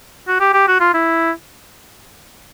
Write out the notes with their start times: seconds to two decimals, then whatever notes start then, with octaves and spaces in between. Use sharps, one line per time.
0.28 F#4
0.40 G4
0.54 G4
0.68 F#4
0.80 F4
0.94 E4